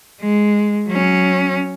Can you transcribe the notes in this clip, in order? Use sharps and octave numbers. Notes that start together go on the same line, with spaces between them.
G#3
F#3 C#4